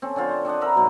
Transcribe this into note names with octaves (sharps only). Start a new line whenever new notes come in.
C4 C#4 A4
D3 C4 F4 C5
C5
C4 D4 D#5 F#5
A#4 E5 A#5 B5
G#2 B2 F#3